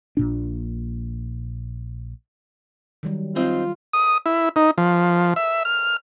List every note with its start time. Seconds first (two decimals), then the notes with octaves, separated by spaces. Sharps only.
0.17 A#1 A#2 D4
3.03 D#3 F#3 G3
3.36 C4 D#4 F4
3.93 D#6
4.26 E4
4.56 D#4
4.78 F3
5.36 E5
5.65 F6